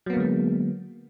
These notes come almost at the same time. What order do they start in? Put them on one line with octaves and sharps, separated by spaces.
F#3 B3 A#3 D3 G#3